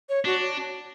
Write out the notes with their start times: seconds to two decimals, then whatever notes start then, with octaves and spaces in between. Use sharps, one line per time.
0.09 C#5
0.25 D4 F#4